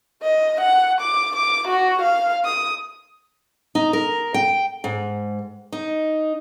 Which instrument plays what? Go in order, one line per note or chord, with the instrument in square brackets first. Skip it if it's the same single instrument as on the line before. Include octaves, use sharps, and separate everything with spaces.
[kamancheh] D#5
F#5
D6
D6
F#4
F5
D#6
[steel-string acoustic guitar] D#4
A#4
G5
G#2
D#4